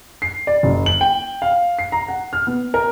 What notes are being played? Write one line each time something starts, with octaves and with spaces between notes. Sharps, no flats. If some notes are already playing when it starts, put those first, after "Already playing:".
C7
D5
F#1
F#7
G5
F5
C7
A#5
F#5
F6
B3
A#4